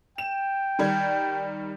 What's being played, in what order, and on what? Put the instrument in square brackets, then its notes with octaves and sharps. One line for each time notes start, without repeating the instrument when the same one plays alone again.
[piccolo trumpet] G5 [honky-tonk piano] E7
[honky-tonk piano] D#3 G3 G#6